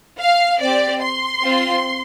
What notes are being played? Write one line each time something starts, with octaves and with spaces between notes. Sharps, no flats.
F5
C4 G4 D5
C6
C4 F4